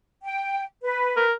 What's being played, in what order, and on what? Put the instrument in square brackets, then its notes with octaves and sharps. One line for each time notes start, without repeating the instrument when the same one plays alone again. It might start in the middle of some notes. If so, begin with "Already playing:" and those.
[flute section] G5
B4
[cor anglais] A#4